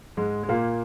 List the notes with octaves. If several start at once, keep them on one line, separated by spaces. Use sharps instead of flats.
G#2 G#3
G#3
A#2 A#3